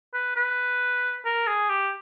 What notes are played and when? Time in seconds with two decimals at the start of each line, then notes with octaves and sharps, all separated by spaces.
0.14 B4
0.36 B4
1.25 A#4
1.47 G#4
1.69 G4